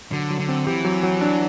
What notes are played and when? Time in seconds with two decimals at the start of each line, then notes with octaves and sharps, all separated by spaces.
0.12 D3 F#3
0.30 F#3
0.39 D3
0.48 C4
0.67 E3 G4
0.85 F#3
1.03 F#3
1.21 D4